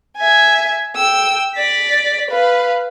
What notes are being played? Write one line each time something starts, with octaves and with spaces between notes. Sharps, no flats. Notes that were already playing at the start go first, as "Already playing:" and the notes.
E5 G#5
G5 E6
D5 B6
B4 F5